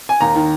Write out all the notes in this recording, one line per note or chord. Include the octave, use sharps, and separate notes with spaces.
G#5
D#2 A#5
D#3